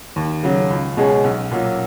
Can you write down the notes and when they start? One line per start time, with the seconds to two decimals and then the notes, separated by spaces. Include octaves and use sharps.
0.16 D#2
0.43 C#3 F#3
0.70 C#2
0.97 B2 G#3 C#4 G#4
1.24 B1
1.52 A#2 F#3